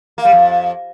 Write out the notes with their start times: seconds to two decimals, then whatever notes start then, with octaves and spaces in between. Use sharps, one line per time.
0.18 A#3
0.25 G3
0.32 F2